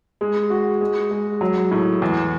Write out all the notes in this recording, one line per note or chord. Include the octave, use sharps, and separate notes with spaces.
G#3
F#4
G#3
G#3
F#3
A2
E2